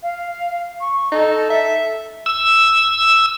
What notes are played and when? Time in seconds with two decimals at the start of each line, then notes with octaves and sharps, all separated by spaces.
0.02 F5
0.80 C#6
1.12 D#4 A4
1.50 E5
2.26 E6